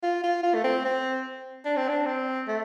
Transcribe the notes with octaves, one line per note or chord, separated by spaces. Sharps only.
F4
F4
F4
A3
C4
C4
D4
C4
D4
C4
A3